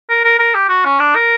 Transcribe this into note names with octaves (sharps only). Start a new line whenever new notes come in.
A#4
A#4
A#4
G4
F#4
C#4
D4
A#4